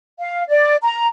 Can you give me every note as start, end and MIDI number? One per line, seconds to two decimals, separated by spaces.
0.20 0.43 77
0.49 0.76 74
0.83 1.07 82